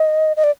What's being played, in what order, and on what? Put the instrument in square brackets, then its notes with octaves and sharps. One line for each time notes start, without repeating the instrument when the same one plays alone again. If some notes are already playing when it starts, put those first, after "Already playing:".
Already playing: [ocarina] D#5
D#5
D5